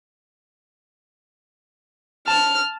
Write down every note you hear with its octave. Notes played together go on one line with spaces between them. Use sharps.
A5 F6